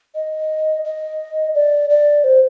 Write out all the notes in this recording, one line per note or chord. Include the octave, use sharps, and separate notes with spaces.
D#5
D#5
D5
D5
C5